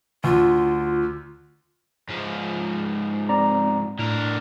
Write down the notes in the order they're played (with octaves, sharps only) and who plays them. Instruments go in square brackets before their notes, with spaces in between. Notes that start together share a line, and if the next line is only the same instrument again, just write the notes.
[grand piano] D2 [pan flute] F4
[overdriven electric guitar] G#2 F3
[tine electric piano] C4 D5 A#5
[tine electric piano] A2 [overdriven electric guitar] D3 A#4